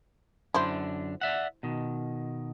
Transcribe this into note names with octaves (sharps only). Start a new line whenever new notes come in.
F#2 D3 D4 E4 C5
D5 E5 F#5
B2 D#3